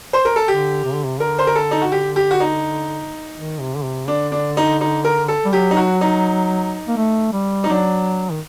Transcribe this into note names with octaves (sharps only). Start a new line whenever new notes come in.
C5
A#4
A4
D3 G4
C3
D3
C3
D3 A#4
C5
A#4
A4
D#4
F#4
G4
G4
F#4
D#4
D#3
C3
D3
C3
D3 D4
D4
D#4
D#4
A#4
A4
G3
F#3 G4
D#4
F#4
D#4
A#3
A3
G3
D#4
F#3 D4
D#3